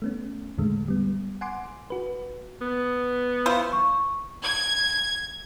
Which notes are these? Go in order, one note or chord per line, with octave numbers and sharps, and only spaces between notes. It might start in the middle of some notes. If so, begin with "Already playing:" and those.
A3 B3 C#4
E2 A2 D3 G#3 A3
G3 B3
F#5 G#5 C6 D6
F#4 B4
B3
E4 F4 C5
C#6
G#6